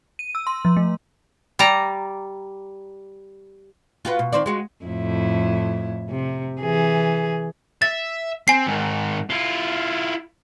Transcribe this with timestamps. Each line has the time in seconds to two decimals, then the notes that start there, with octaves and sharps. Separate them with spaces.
0.19 D#7
0.35 E6
0.47 C6
0.65 F3
0.77 A3
1.59 G3 D5 A#5
4.05 F4 F#4 B4
4.19 B2
4.32 D#3 C4 D5
4.46 G#3 F#4
4.85 F2 A2 E4
6.09 C3
6.61 E3 G#4
7.82 E5 A6
8.48 C4 G#5 C7
8.66 G#2 D#3
9.30 E4 F4